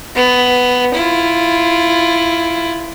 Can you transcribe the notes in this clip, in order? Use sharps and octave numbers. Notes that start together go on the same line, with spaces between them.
B3
E4 F4